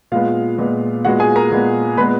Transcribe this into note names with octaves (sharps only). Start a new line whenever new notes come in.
A#2 G#3 B3 F4 F5
A#2 G#3 B3
A#2 G#3 B3 F#4 F#5
G#4 G#5
A#4 A#5
A#2 G#3 B3
A#2 G#3 B3 B4 B5